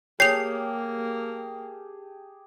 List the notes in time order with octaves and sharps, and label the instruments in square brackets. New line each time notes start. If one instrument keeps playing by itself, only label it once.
[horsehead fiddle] A#3 [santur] G4 G#4 A5 [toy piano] C#5 [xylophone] C7 F7